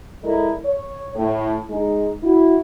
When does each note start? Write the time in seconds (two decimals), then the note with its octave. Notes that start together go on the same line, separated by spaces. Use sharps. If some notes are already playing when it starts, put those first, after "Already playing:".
0.23 G#3 E4 A4 A#4 D5 D#5
0.65 C#5
1.15 A2
1.70 G#3 D#4
2.23 E4 F#4